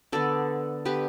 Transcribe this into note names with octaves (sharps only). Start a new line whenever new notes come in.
D3 B3 A4 D5
D3 B3 G4 B4